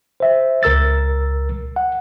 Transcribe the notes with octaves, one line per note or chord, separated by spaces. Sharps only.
C5 E5
C#2 A#4 E6 A6
F#5